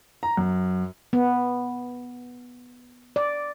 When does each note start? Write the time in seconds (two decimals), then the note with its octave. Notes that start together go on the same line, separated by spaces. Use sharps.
0.23 A#5
0.37 F#2
1.13 B3
3.16 D5